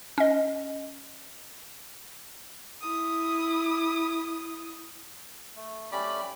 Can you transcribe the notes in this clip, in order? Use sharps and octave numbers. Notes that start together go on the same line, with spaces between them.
C#4 D#5
E4 D#6
A3
A3 C#4 G4 D5 B5